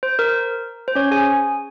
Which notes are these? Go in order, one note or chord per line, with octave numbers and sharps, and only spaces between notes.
C5
A#4
C5
C#4 C#5
G#4 G#5